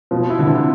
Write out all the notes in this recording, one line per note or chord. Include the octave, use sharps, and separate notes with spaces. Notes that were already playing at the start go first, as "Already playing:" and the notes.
B2 F3
E4
D3
C3